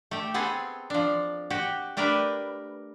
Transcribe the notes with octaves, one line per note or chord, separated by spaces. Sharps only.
A3 G4
B3 C4 G#4 A4
F3 D4
F#4 G4
A3 D4 G4 A#4 B4